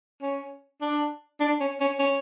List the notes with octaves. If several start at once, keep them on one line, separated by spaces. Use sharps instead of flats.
C#4
D4
D4
C#4
C#4
C#4